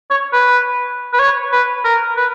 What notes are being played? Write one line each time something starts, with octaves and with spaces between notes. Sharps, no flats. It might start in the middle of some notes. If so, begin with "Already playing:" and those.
C#5
B4
B4
C#5
B4
A#4
B4